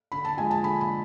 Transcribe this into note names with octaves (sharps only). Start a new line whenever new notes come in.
D3 B5
A5
F3 G#3 G#5
A5
D3 B5
B5